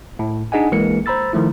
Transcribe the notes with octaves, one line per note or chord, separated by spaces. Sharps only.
A2
D4 D#4 G#4 D#5 F#5 G#5
B1 E3 G#3 A#3 A#4 C#7
C5 A#5 B5 E6 A6
D#3 F3 A3 E4